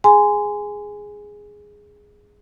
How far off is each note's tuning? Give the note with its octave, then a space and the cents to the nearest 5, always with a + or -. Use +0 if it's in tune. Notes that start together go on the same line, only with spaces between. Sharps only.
G#4 +0 G#5 -5 C6 -25